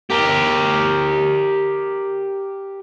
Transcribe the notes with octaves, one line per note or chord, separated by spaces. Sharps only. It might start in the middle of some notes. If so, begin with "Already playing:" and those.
G4 A#4